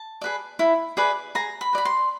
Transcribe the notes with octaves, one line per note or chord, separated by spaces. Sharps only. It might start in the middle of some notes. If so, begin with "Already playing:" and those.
Already playing: A5
G#4 B4 D5
E4
G#4 B4 D5
G#4 A#5
B5
B4 D5 B5
C6